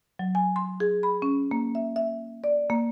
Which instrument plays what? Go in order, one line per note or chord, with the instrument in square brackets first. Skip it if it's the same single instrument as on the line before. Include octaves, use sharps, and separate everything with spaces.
[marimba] F#3
G#5
C6
G#4
B5
C#4
A#3
E5
E5
D5
A#3